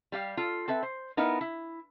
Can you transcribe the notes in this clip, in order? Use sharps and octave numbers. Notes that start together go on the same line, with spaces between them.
G3 G4 F5
F4 A4
C4 A4 B4 E5
C5
B3 D#4 E4 A#4 F5
E4